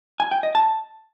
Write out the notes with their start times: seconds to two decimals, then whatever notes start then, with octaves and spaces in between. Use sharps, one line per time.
0.20 G#5
0.31 G5
0.43 D#5
0.55 A5